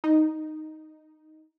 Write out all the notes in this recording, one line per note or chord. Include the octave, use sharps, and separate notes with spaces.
D#4